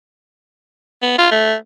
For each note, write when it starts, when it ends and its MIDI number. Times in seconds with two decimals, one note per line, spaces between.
1.02 1.13 59
1.18 1.26 65
1.31 1.55 57